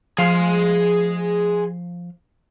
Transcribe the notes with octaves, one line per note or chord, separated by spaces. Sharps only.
F3 G#4 F5 C6